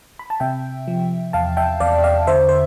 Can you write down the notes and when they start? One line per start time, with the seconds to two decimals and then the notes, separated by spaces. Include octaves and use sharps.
0.19 B5
0.30 A5
0.40 C3 E5 G5
0.88 F3
1.33 E2 F5 A5
1.57 E5 G5
1.80 E2 D5 F5
2.04 D5 F5
2.27 D3 C5 E5
2.49 C5